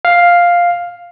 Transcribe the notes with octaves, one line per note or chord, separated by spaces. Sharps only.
F5